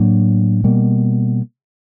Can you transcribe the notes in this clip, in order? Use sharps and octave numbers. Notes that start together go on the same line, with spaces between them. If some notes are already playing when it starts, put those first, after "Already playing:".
Already playing: A2 F#3 A#3 D4
B2 G3 A#3